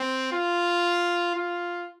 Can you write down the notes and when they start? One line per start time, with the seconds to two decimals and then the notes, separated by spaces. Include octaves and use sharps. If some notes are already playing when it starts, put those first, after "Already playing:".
Already playing: C4
0.32 F4
1.35 F4